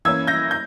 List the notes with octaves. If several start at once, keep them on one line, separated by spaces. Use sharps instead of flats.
E3 A#3 C#4 E6 G#6
G6 A#6
G6